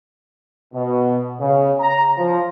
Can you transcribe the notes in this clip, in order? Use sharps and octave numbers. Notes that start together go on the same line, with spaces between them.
B2
C#3
A#5
F3